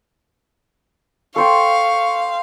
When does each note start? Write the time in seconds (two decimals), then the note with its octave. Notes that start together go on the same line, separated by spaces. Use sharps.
1.36 A4 C5 F5 G5 C#6